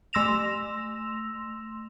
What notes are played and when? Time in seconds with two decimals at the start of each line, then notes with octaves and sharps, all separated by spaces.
0.13 A3 C6 E6 A#6 E7 F7